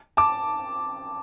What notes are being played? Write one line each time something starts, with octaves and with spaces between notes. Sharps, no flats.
A5 D6